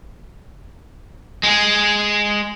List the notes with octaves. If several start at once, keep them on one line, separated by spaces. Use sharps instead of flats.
G#3 G#4